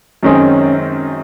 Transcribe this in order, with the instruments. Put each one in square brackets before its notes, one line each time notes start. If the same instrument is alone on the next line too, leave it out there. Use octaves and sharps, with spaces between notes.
[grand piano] F#2 D#3 G#3 C4 [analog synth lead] C#4